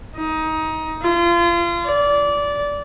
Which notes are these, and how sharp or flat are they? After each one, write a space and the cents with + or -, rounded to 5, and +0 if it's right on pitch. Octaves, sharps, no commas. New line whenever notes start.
D#4 +20
F4 -30
D5 -20